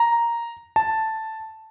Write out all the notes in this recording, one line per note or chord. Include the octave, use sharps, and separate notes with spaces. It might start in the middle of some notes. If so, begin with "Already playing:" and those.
Already playing: A#5
A5